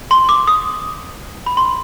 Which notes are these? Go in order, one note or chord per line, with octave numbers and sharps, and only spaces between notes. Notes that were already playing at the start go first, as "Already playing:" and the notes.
C6
D6
D#6
B5
C6